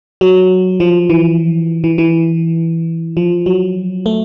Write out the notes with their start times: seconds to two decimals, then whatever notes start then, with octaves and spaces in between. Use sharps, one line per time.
0.21 F#3
0.80 F3
1.10 E3
1.84 E3
1.98 E3
3.17 F3
3.46 F#3
4.06 A3